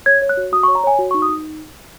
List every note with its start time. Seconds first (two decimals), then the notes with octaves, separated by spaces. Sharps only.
0.06 C#5 G#6
0.22 C#5
0.29 F#6
0.37 F#4
0.52 F#4 D#6
0.63 C#6
0.68 C#5
0.75 A#5
0.84 C#5 G#5
0.99 F#4
1.11 C#6
1.14 D#4
1.22 D#6
1.29 D#4